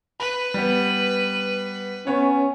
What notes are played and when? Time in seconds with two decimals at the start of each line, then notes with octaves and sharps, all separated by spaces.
0.20 B4 B5
0.54 G3 B3
2.07 B3 C#4 C#5